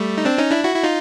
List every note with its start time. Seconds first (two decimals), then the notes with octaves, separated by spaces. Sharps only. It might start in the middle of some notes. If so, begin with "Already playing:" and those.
Already playing: G3 A3
0.18 D#4
0.25 C4 D4
0.38 C#4 D#4
0.51 D4 E4
0.64 E4 F#4
0.75 E4
0.83 D#4 F4